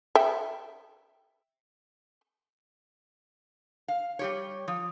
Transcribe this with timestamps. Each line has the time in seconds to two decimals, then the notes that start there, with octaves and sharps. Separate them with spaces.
0.15 E5 G5
3.88 F5
4.19 G3 G4 C#5
4.68 F3